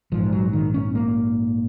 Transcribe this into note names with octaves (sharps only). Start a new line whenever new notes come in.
A#1 G#2 F3
F#3
D#3
C#4
A#3